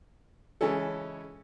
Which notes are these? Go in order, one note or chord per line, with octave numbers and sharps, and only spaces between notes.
C#3 E3 G#3 C#4 A4